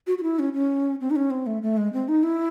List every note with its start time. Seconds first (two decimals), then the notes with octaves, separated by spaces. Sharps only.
0.07 F#4
0.18 F#4
0.23 E4
0.39 C#4
0.53 C#4
1.01 C4
1.10 D#4
1.16 C#4
1.31 C4
1.47 A3
1.62 A3
1.77 G#3
1.93 C4
2.08 D#4
2.23 E4